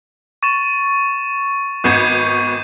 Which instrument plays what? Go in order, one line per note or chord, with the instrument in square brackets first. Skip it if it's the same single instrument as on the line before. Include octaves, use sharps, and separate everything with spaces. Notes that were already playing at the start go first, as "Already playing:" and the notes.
[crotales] C#6 A6 E7
[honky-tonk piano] G#1 B3 G#6 [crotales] C#6 G6 E7